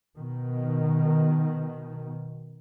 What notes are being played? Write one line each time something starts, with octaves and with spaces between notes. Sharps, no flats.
B2 D#3